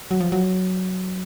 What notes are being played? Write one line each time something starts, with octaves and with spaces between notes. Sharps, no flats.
F#3
F3
F#3